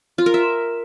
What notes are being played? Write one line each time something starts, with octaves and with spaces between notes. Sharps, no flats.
F4
A#4
E5